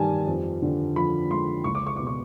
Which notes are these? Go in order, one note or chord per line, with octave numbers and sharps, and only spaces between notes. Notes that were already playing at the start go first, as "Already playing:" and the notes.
Already playing: G2 D#3 G3 G#5 A5
F2
D3
F3 B5
G#3 C6
C#2 C#6
D6
C#6
B2 D6
C#6